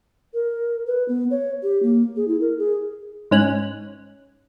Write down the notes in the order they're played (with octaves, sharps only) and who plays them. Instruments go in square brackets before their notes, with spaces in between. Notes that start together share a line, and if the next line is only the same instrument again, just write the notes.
[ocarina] A#4
B4
B3
C#5
G4
A#3
G#4
E4
A#4
G#4
[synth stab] G#2 C#4 F#6